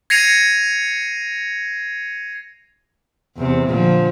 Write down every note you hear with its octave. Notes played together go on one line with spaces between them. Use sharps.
G#6 A#6 C7 C#7 D#7 F7
E2 C3
A#2 D3 F3